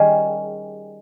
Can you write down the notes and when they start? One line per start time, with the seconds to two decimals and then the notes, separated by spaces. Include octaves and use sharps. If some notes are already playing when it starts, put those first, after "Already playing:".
Already playing: D#3 G3 C#4 G#4